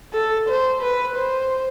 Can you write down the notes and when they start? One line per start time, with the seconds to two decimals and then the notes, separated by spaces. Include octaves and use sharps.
0.13 A4
0.48 C5
0.81 B4
1.15 C5